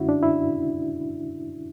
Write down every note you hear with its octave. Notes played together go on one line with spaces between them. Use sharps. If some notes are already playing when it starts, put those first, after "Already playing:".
Already playing: F#2 D3 G#3 C#4 E4 F#4
D4
E4